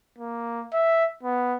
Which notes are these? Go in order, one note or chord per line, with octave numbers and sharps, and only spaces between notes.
A#3
E5
B3